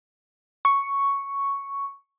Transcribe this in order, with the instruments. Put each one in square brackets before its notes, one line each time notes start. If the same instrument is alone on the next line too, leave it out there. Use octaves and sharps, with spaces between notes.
[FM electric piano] C#6